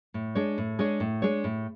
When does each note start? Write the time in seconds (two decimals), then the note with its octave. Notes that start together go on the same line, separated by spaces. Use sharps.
0.14 A2
0.35 G#3 D4 G#4 C#5
0.58 A2
0.79 G#3 D4 G#4 C#5
1.00 A2
1.22 G#3 D4 G#4 C#5
1.44 A2